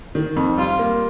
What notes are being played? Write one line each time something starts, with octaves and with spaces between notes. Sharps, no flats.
D#3
F2
G3 F4
A#3